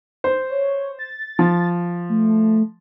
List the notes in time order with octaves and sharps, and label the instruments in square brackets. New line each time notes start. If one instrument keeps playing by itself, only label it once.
[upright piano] C5
[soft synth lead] C#5
A6
[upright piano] F3
[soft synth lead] A3